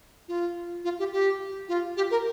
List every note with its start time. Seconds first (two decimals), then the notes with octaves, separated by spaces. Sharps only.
0.28 F4
0.84 F4
0.99 G4
1.12 G4
1.69 F4
1.97 G4
2.11 A#4